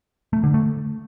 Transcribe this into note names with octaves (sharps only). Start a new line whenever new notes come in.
A3
D3
A3